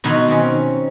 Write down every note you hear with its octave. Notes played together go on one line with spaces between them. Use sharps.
B2 D#3 F#3 D#4 B5 C6
C4 C#4